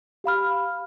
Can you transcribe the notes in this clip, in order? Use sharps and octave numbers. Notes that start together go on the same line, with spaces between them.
G4 F5 B5 F6